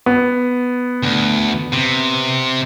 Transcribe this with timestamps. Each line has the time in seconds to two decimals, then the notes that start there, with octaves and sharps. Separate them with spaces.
0.06 B3
1.03 D2
1.73 C3